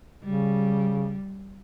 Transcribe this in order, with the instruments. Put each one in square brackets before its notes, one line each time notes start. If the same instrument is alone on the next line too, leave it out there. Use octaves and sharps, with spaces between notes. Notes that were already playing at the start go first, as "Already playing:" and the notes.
[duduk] C#3 [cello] G3